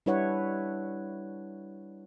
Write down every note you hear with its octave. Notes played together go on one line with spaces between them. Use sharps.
G3 D4 E4 B4 C#5 F#5